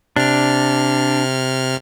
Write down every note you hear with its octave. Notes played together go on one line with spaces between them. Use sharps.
C3 D4 F6